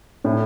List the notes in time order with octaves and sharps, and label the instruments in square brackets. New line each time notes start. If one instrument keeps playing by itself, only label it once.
[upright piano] A2